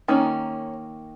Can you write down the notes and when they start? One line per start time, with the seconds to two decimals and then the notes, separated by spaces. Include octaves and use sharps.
0.08 D#3 A#3 C#4